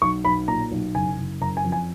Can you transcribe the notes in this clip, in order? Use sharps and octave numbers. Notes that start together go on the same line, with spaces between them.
B1 C#6
B1 B5
A#2 A#5
B1
F#1 G#5
F#1
F#1 A#5
G#5
F2
G#5